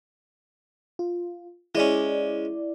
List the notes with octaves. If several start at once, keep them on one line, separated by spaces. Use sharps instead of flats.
F4
G#3 C#4 E4 D5